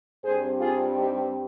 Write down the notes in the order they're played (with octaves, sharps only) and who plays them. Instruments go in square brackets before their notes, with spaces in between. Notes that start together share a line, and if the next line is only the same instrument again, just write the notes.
[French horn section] G2 G3 C4 G#4 C5
F4 G#4
D#4 G4